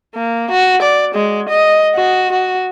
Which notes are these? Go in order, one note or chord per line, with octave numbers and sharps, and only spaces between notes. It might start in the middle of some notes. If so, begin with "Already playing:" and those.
A#3
F#4
D5
G#3
D#5
F#4
F#4